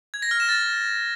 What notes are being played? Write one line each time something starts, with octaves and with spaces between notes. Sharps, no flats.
G#6
A#6
F6
E7
A6